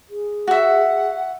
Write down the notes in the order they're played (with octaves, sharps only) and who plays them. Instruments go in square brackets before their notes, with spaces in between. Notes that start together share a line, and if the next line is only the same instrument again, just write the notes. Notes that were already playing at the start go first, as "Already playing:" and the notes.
[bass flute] G#4
[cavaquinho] F#4 E5 [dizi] F#5